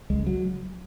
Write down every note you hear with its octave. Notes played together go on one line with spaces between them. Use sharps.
C#2 G#3
F#3